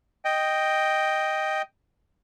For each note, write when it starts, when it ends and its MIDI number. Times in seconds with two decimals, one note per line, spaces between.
0.25 1.62 75
0.25 1.62 79